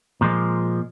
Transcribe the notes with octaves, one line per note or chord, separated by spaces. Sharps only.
A#2 F3 G#3